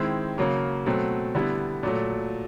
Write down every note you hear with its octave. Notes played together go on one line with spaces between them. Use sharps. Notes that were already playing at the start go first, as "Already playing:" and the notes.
Already playing: D#3 G#3 C4 E4
C#3 F#3 A#3
B2 F#3 A3 C4
D3 G3 B3 E4
A#2 F#3 A3